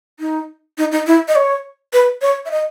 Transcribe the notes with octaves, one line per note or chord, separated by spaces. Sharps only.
D#4
D#4
D#4
E4
D#5
C#5
B4
C#5
E5
D#5